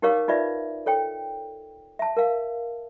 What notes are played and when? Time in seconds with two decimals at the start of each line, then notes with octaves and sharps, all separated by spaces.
0.02 D#4 G4 A#4 C#5 F5 D6
0.28 D#4 F4 B4 D5 E5
0.86 A4 C#5 G5
1.99 E5 A5
2.17 A#4 F5